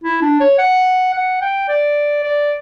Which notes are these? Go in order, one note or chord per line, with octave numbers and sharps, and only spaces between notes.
E4
D4
C#5
F#5
F#5
G5
D5
D5